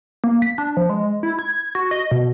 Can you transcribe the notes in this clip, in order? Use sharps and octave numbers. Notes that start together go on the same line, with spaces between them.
A#3
B6
D4
F3
G#3
E4
G#6
F#4
D#5
B2